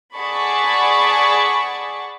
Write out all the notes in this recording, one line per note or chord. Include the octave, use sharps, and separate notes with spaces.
G#4 D5 F#5 A5 B5 C#6